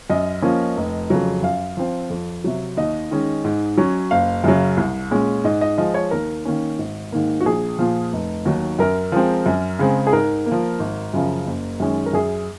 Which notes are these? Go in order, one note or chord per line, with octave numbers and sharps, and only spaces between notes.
F#2 D#5
F3 A#3 C#4
F1
F2 C#3 F#3
F#2 F5
F3 C4
F2
C3 F#3
D#2 D#5
D#3 G#3 C#4
G#2
F#3 C#4
F#1 F5
F#2 C#3 F#3
C2
A#2 G#3 C#4
G#2 D#5
D#5
F3 G#3 D#5
C#5
D#2 A#4
D#3 A#3 C#4
G#1
G#2 D#3 A#3
F#4
A#1 G#4
A#2 F3
F1
D#2 D#3 F#3
F#2 A#4
F3 G#3 C4
F#2
C#3 G#3 C4
G#4
G#2 A#4
A#3
F3
G#1
F#2 C#3 F3
F#1
F#2 D#3 G#3 C#4
A#4
F#2 G#4